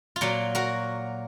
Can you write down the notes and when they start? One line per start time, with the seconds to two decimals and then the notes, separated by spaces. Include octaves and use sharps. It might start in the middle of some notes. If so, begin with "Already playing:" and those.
0.16 F4
0.21 A#2 F#3 A#3 F#4
0.55 F#4 A#4